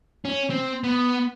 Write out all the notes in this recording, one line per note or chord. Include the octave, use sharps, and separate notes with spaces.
C#4
C4
B3